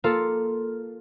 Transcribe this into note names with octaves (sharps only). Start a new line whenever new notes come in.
A#3 F4 A4